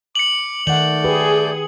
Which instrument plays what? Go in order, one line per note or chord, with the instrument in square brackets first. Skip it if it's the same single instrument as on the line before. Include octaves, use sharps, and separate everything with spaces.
[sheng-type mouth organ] D6 [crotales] C#7 F#7
[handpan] D#3 F#5 [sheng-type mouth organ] A3 D5 G6 [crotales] F#7
[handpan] G4 B4 [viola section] G#4